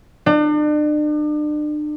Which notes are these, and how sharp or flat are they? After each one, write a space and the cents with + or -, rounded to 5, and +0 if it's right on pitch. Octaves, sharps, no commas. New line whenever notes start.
D4 +40